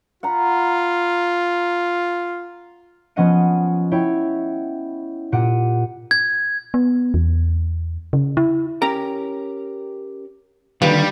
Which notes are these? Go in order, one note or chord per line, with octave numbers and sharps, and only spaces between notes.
F4 F#5 A#5 B5
F3 B3 C#4 D#5 F#5 D#7
E4 C#5 G5
A#2 G4 F#5 D7 D#7
G#6
B3
E2
C#3
E4
C#4 G4 A#4 A#5
C2 A#2 D3 D#3 G3 F4 B4